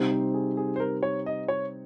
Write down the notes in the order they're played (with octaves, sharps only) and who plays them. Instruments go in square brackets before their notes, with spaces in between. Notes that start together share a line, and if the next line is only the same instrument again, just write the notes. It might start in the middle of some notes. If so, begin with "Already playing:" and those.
Already playing: [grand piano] C3 G3 C4 D#4 G4
[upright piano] C5
G#4
G#4
C5
A#4
C#5
D#5
C#5